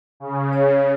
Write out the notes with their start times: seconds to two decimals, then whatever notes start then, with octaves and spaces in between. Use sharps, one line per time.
0.20 C#3
0.53 C#5